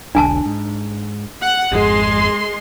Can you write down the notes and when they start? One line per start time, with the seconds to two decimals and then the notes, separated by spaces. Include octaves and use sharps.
0.15 E1 B1 D3 D4 G#5 A5
0.46 G#2
1.42 F#5
1.72 G#1 F2 G#2 G#3 C6